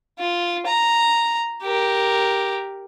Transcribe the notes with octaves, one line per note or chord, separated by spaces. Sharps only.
F4
A#5
G4 A#4